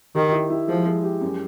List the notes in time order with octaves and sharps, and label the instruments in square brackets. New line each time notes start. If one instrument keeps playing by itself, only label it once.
[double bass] D#3 [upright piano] G4
[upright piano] E4
E4
[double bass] F3 [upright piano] G#3
[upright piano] G#3
G4
F#2